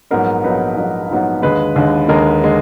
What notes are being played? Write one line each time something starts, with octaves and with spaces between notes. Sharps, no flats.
A#1 G#2 F#3 B3 D#4 A#4
A#1 G#2 F#3 B3 D#4 B4
A#1 G#2 F#3 B3 D#4
A#1 G#2 F#3 B3 D#4
D#2 D3 G#3 B4
D#2 D3 G#3
D#2 D3 G#3 A#4
D3 G#3